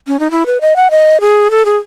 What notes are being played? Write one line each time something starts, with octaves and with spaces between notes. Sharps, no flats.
C#4
D#4
E4
B4
D#5
F#5
D#5
G#4
A4
G#4